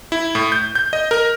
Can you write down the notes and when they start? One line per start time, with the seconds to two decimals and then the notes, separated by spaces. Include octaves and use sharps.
0.12 E4
0.35 A2
0.52 G6
0.75 G6
0.93 D#5
1.11 A#4